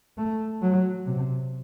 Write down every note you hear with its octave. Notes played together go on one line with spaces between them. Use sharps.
A3
F#3
C3